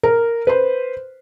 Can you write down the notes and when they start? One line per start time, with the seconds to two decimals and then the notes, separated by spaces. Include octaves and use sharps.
0.03 A#4
0.47 B4 C5